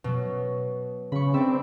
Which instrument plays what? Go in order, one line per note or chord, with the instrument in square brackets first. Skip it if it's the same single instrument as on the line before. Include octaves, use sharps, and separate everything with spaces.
[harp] B2 F#3
[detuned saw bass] C#3 [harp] B5 C#6
[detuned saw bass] C4 [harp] D4 D5 E5